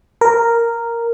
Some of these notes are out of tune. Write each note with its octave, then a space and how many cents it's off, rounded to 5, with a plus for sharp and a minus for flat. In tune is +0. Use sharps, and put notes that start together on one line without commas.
A#4 -5